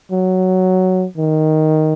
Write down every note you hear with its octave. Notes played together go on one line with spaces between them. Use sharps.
F#3
D#3